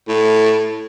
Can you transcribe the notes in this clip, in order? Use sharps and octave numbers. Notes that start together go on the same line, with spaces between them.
A2